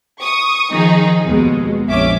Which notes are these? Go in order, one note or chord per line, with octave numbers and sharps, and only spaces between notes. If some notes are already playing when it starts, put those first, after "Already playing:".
C#6 D#6
D#3 F3 D#4 G#4
D#2 B2 G#3
A#1 F2 C#4 E5 D6